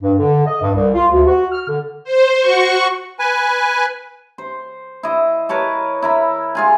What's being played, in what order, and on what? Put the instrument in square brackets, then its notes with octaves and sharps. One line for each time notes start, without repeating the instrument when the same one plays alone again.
[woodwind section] G2
D3
D#5
G2
C2
F4
D2
F#4
F6
D3
[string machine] C5
F#4 C#6
[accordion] B4 G#5
[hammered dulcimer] C5
E4 D#5
A#4 B4 C#5 A5
E4 A#4 B5
G#3 F4 G#5